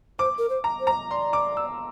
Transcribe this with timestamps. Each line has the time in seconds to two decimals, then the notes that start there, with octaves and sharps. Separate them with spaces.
0.19 C5 D6
0.38 A#4
0.49 C5
0.64 A#5
0.80 C5
0.87 A#5
1.10 D5 C6
1.33 D6
1.57 E6